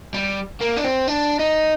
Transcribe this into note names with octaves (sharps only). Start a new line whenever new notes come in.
G3
A#3
D4
C4
D4
D#4